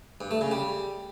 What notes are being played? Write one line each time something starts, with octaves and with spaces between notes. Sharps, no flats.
G2
A3
C#3
G3